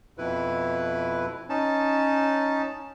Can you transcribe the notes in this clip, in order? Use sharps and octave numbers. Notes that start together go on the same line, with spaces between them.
F2 B2 E4 B4
C#4 D#4 A5